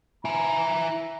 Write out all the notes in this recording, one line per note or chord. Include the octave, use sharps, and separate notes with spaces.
E4 G#5 A#5